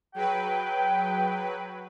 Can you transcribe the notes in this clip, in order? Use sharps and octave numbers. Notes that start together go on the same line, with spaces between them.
F#3 G#4 B4 G5